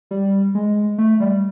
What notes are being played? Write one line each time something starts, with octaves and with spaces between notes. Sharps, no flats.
G3
G#3
A3
G3